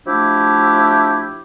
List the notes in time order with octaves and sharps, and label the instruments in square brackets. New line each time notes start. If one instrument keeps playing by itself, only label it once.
[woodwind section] F3 A3 D4 E4 G4